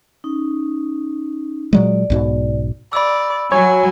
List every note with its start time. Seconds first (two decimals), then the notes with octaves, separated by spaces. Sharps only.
0.24 C#4 D#4
1.73 A#2 F#3 G#3 D5
2.10 B1 G#2 B2
2.93 D5 B5 E6
3.52 F#3 C#5 G#5